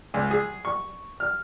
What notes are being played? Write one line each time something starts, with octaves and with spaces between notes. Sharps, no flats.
C#2
G#4
C#6
F6